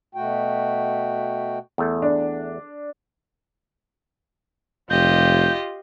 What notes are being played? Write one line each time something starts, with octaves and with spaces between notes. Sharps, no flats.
B2 A3 F#4 G5
E2 A3
D4
F1 F4 G4 D#5 G6